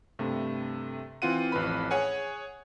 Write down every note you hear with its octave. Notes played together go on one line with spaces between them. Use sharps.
G2 C3 A3
E3 C4 F4 F#5 D#7
A1 F2 B4 B5
G#4 C#5 F#5 G#5